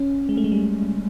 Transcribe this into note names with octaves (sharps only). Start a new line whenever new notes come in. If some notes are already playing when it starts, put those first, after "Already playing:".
Already playing: C#4
G#3
A3
G#3
G3